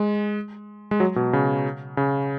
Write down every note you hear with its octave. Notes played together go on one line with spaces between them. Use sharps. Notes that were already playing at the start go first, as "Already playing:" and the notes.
Already playing: G#3
G#3
F#3
B2
C#3
C#3